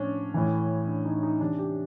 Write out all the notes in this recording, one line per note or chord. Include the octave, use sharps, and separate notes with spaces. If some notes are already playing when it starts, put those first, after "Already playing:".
Already playing: A2 F3 C#4 D4
A2 E3
D4
D#4
D#4
C3 E3 D4
G4